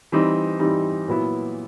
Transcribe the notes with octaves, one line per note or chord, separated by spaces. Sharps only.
E3 G3 C4 D#4
E3 G3 C4 D#4
A#2 F#3 B3 E4